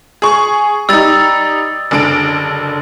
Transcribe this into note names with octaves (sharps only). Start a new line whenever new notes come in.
G#4 C#6
G3 D#4 E6 A6
F#1 D3 D7